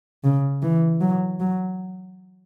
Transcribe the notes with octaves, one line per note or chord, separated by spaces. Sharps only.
C#3
E3
F#3
F#3